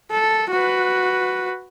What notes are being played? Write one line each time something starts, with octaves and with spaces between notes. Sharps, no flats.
A4
F#4 B4